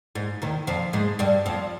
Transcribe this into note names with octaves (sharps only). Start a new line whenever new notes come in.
G#2
D#2 D#3
F2 F3
G#2 G#3
G2 G3
F2 F3